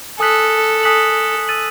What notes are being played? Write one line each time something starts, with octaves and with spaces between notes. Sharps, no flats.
A4 G#5 D#6 F#6 B6 F#7
G#5 D#6 F#6 B6 F#7
E6 A6 D#7 F#7